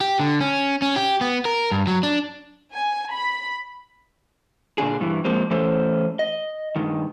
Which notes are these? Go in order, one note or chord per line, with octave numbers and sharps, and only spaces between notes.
G4
D3
C#4
C#4
G4
B3
A#4
G2
F#3
D4
G#5
B5
A#2 D3 D4 G#4
G2 E3
F3 G#3 A#3 C4
E3 A3 C#4 A4 C5
D#5
G2 D#3